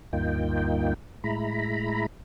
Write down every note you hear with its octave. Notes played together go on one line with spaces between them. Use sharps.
D2 G2 A#3 D#4 F4 G5
A2 G#3 E4 A#5 B5